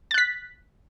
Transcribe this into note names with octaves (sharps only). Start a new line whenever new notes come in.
F#6 A6 B6